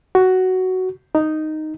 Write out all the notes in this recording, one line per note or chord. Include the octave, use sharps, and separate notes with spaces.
F#4
D#4